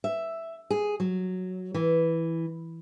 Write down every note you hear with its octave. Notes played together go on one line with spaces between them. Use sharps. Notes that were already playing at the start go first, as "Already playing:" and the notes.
E5
G#4
F#3
E3